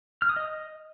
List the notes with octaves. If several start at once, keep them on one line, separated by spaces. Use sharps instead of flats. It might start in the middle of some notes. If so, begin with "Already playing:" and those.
F6
D#6
D#5